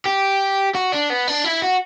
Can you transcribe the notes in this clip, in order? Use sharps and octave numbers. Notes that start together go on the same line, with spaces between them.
G4
F#4
D4
B3
D4
E4
F#4